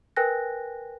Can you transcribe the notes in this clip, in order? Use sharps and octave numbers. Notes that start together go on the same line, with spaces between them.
A#4 B4 G5 G#5 F#6 A#6